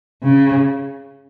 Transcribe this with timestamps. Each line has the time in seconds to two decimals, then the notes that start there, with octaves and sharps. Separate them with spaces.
0.23 C#3